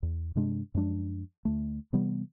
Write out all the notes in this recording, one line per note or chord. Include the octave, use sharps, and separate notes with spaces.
E2
G2 C3 G#3 D4
F#2 F3 G#3 D4
D2 A3
C3 E3 G3 B3